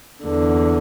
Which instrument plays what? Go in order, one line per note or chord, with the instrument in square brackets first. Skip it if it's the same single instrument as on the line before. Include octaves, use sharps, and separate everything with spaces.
[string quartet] E2 D3